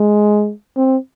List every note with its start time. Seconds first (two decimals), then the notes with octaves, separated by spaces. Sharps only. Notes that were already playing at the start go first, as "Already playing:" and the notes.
Already playing: G#3
0.77 C4